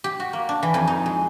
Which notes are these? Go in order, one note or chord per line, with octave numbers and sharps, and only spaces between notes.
G4
F#4
A#3
D4
E3
F2
D#4
G#3